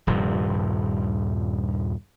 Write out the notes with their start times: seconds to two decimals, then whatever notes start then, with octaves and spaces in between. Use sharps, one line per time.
0.07 D#1 G2 C3 F3